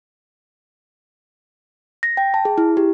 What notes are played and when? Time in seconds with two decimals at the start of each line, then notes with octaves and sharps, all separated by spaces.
2.03 A#6
2.17 G5
2.34 A5
2.45 G#4
2.58 E4
2.77 G4